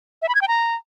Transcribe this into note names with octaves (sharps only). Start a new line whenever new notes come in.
E5
B5
G#6
G5
A#5